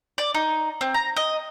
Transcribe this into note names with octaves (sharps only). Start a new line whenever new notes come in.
D5
D#4
C4
A#5
D#5